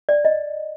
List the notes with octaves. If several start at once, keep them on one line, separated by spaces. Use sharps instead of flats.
D5
D#5